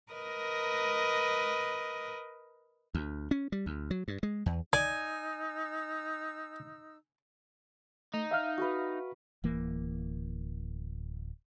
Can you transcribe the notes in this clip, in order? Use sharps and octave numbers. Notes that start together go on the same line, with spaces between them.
A#4 B4 D#5
D2
C#4
G3
D2
F#3
G2
G#3
E2
D#4 D5 G#5 E6
A3 D#4
E5 F5 F6
F#4 A#4 B4
D1 E3 A#3